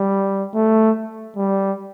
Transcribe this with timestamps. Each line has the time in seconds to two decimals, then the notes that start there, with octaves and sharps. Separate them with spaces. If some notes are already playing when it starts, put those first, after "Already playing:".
Already playing: G3
0.54 A3
1.37 G3